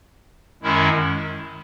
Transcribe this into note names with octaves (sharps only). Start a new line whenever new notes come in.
F#2 D#3 G#3 C#4 E4